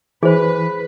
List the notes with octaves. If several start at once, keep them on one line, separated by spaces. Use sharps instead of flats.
E3 G#4 B4 C5